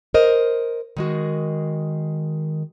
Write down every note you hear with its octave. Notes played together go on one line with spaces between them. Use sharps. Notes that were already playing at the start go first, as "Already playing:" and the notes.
A#4 C5 D#5
D#3 G#3 F#4